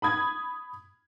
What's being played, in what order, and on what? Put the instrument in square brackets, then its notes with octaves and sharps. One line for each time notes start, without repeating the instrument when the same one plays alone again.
[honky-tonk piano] B5 D#6 G#6